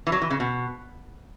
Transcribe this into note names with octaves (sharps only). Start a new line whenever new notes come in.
E3
F#3
E3
C#3
B2